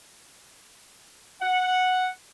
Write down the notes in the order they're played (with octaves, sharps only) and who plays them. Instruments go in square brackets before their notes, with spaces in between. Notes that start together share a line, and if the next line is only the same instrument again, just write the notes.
[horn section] F#5